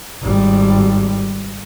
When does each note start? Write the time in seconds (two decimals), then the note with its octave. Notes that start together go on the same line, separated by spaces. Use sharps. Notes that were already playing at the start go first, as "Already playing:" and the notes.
0.23 G#1 G3